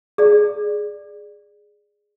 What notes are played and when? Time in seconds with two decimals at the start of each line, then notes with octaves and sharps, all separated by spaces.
0.18 G#4 D5